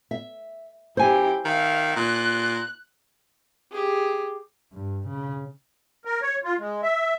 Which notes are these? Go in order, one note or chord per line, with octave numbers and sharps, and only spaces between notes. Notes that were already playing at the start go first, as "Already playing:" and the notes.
E5
F#2 E4 G4 C5 G#5
D#3 E5 F5
A#2 F#6
G4 G#4
G2
C#3
A#4
C#5
F4
G#3
E5